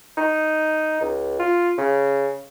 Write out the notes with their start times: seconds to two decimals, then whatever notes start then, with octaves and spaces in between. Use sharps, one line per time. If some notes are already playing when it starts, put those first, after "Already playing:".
0.17 D#4
1.00 C#2
1.39 F4
1.78 C#3